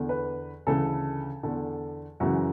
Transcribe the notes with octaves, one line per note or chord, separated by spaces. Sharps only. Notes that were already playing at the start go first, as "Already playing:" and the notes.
Already playing: E2 D3
B4
D2 C#3 E3 A4
E2 D3 A4
F#2 C#3 E3 F#4